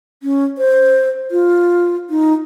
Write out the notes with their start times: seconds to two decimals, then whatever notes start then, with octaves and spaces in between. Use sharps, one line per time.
0.23 C#4
0.58 C5
1.31 F4
2.10 D#4